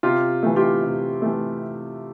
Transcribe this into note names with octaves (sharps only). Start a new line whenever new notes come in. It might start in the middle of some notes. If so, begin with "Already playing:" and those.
C3 F4 G4
E3 A3
F4 G4
C3
E3 A3